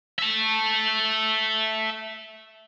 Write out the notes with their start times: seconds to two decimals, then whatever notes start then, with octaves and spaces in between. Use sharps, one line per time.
0.19 E5 A5